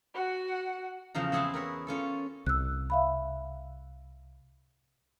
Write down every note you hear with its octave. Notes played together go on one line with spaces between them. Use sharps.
F#4 F#5
E2 C#3 F3 F5 A#5
C4 E4 G#4 F#5 A5
A#4 B4 C#5
C#4 F4 A4
C2 E6 F#6
E5 F5 B5